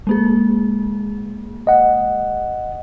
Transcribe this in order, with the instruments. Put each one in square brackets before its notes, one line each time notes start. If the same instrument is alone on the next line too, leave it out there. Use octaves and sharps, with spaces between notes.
[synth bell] G#3 A#3 G#4
[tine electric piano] D#5 F#5